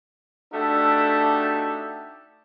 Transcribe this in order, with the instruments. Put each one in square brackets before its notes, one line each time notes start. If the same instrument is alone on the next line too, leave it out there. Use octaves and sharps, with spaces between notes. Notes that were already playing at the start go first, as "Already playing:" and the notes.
[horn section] A3 D4 D#4 F#4 G4 A4